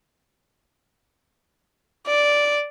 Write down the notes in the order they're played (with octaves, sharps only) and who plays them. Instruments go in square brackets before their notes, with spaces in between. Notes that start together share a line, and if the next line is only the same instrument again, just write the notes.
[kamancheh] D5